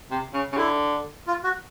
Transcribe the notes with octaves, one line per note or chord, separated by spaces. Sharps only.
C3
C#3
C#3
D3 E4
F4
F#4